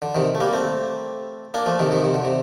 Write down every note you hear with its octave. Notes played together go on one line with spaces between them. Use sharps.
D3
C3 D#3
A3
G3 A#3
A3 C4
A#3 D4
F3 A3
C3 D#3
C3 D#3
C3
D3
C3